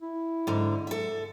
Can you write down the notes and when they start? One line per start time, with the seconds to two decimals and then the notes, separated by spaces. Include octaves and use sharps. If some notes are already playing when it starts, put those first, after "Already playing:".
0.01 E4
0.47 G#2 D3
0.87 A4 E5